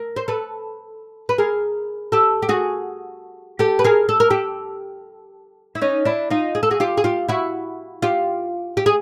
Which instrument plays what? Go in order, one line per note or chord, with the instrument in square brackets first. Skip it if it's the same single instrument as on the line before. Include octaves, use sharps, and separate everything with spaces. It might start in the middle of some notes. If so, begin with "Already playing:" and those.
Already playing: [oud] A#4
C5
A4 B4
B4
G#4 A#4
G4 A4
G4
F#4 G#4
G4 A4
B4
G#4 A#4
A4
A#4
G4 A4
E4
C#4 D#4
D4 E4
D#4 F4
G#4
A4
F#4 G#4
F4 G4
G#4
F4 G4
E4 F#4
F4 G4
G4
G#4